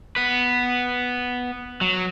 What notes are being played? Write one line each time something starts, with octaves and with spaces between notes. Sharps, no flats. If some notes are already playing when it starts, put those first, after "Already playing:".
B3 B4
F#3